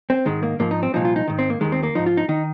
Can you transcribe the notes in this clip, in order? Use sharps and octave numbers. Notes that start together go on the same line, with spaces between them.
C4
G#2 D#3 G#3
A#3
G#2 F3 A#3
D#4
C4
C2 A#2 F3 D#4
F4
D#4
G#2 D#3
C4
A#3
D#2 D#3 G#3
C4
A#3
G#2 F3 D#4
F4
D#4
D#3 D#4